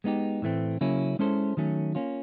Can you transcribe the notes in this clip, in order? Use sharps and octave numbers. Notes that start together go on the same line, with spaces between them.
G#3 B3 D#4 G4
A2 E3 A3 C4
C#3 F#3 A#3 C#4 E4
G#3 C#4 E4 A4 C5
D#3 F#3 A3 C#4
A#3 C#4 F4